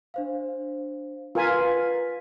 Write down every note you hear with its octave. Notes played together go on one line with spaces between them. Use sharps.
D4 C5 F5
F4 A#4 B4 F5 G#5 B6